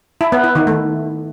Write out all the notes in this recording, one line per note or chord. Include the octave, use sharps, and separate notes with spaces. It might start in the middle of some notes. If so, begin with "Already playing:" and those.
E4
B3
E4
D#3
A3